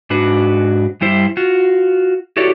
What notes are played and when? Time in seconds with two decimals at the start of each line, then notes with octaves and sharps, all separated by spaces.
0.10 G#2 D4 F#4 B4
1.01 G2 G3 E4 C5
1.37 F4 F#4
2.37 E4 F#4 G4 A4 C#5 D5